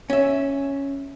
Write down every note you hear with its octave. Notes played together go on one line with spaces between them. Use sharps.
C#4 E5